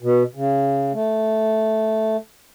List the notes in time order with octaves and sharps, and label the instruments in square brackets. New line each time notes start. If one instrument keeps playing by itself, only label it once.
[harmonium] B2
C#3
A3